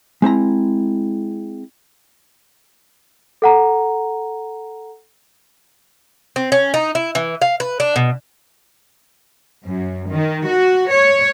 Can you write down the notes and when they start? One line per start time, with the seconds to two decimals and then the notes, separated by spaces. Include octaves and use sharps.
0.22 G#3 C4 E4 A#5
3.42 A4 F#5 A#5
6.36 C4
6.52 C#4
6.74 D#4
6.95 E4
7.15 E3
7.42 F5
7.60 B4
7.80 D4
7.96 B2
9.65 F#2
10.11 D#3
10.48 F#4
10.92 C#5